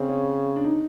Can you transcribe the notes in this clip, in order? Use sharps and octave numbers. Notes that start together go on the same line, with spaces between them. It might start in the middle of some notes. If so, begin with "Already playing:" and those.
Already playing: C#3 C4
C#4
D4
D#4